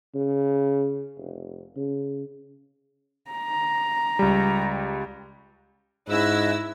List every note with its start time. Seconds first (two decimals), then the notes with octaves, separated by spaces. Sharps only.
0.15 C#3
1.18 F1
1.76 C#3
3.31 A#5
4.19 C#2 G3
6.09 G#2 C#4 E4 D#5 E6 F#6